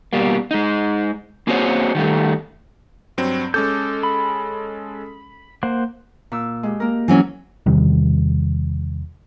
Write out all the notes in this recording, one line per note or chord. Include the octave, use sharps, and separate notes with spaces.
B2 G3 A#3
G#3 D#4
A#3 C4 F#4 G#4 C5 C#5
D#3 G3 A3
G2 F#3 C4
G#3 C#4 A4 D6 G6
B5
A#3 C5 F#5
A#2 E6
G#3 G4
A#3 A#4
E3 F#3 C#4
E2 C3 D#3 G3